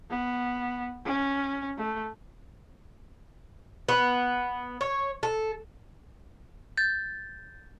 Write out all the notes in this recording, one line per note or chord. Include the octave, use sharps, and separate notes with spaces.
B3
C#4
A3
B3
C#5
A4
G6 A6